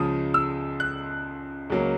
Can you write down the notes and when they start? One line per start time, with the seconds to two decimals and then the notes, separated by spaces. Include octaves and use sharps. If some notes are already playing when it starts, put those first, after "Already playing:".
Already playing: C#2 C#3 F3 G#3 D#6
0.34 E6
0.80 F#6
1.70 C#2 C#3 F#3 A#3